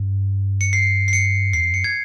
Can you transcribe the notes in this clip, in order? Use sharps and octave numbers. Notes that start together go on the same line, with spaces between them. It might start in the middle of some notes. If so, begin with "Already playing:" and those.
Already playing: G2
C#7
C7
C7
C#7
E2 C7
F2
F#2 C#7
G#6